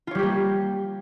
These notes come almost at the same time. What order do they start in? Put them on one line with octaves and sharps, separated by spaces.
F4 C#5 G3 G4 A#3